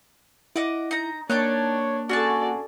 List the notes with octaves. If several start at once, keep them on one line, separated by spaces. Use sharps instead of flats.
E4 D#5 F#5 D6
D#4 A#5
A#3 D4 D#4 C#5 G5 A5 F#6
C#4 F#4 G#4 A4 D5 A5